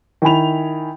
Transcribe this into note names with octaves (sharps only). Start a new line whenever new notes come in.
D#3 E4 G#5 B5 F7